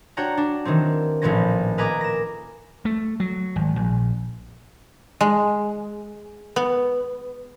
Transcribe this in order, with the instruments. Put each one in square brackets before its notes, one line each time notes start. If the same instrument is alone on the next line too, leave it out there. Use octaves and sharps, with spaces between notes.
[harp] D4 F#4 C#5 F#5 G5 A#5
D4
D#3 E3 F#3 C4
A#1 A2 F3 B3 C#4 A#6
A#4 B4 D#5 G#5 A#5 D6
A#6 E7
[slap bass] A3
F#3
G#1
A#1
[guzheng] G#3
B3